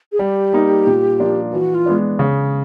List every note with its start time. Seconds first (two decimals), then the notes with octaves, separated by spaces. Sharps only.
0.12 G#4
0.19 G3 G4
0.53 A#3 D#4
0.87 A#2
1.20 F3 A#3 D4 F4
1.52 E3 F#4
1.75 F4
1.86 G#3 B3 D4
2.19 C#3